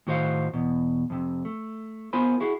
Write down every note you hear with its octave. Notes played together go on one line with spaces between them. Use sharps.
A2 D#3 F#4 C5 E5 F5
E2 B2
F2 C3
A3
B3 F4 A#4 C5 G#5 B5
E4 F#4 G#4